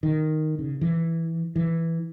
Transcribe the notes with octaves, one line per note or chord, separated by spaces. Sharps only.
D#3
C#3
E3
E3